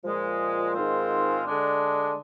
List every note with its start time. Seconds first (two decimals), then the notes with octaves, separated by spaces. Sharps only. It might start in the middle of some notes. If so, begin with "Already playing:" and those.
0.04 A#2 F3 G#3
0.75 G#2 D#3 G#3 C4 F4
1.45 D3 G#3 D4